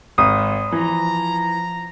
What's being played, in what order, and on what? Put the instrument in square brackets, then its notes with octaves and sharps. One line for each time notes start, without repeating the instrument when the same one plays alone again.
[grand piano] G#1 [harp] D#6
[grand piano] E3 [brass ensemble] F3 A#5